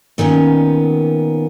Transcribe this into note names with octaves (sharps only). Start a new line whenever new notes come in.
A#2 D#3 B3 C#4